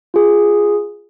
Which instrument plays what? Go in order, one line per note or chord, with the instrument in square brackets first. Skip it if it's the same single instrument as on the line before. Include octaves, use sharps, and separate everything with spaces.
[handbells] F4 G#4